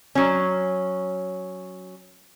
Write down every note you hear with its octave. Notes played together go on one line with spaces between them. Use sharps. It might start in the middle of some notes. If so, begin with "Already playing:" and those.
F#3 C#4